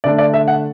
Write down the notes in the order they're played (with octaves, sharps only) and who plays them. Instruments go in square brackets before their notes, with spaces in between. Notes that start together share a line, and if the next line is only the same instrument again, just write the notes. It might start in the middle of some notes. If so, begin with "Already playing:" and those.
[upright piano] D3 A3 D4 D5
D5
E5
F#5